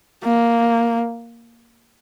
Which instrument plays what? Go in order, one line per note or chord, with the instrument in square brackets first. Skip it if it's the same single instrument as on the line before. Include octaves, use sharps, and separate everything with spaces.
[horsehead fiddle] A#3